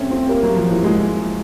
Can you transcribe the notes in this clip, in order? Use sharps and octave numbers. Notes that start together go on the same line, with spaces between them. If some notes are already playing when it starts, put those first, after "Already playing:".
Already playing: A3 C4 C#4
C4
A#3
F#3
F3
E3
G#3